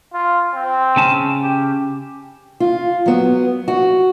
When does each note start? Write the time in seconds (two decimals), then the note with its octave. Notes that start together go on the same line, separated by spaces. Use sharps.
0.13 F4
0.54 C4
0.96 C#3 C#4 A5
1.42 G4
2.60 F4
3.06 F#3 B3
3.68 F#4